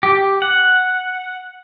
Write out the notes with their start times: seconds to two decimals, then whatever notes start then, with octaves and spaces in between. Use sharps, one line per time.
0.03 G4
0.42 F#5